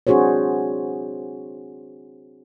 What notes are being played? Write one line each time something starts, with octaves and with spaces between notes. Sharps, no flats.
C4 D4 F#4 G#4 C5 C#5